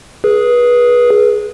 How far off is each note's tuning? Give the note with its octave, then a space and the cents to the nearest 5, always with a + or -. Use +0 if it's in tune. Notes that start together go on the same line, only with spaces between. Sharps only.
G#4 +10 B4 -25